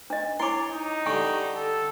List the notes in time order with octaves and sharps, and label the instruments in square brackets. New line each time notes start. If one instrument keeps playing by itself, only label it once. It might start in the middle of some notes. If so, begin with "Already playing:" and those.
[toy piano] D4 D#5
[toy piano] E4 G#5 D6 [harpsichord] C#5 C6
[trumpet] D#4
[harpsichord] D3 G3 [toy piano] G#5 C#6
[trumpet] A4